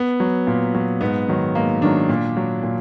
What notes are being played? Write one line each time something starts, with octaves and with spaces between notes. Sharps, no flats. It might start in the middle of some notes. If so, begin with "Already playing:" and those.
Already playing: B3
F#3
A#2
F#3
G#2 B3
D#3 F#3
G#2 A#3
D#3 F#3 D4
A#2
F#3
A#2